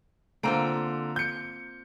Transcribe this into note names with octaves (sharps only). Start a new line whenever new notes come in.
D3 A#3 C4 F4 A#5 D7
G6 C#7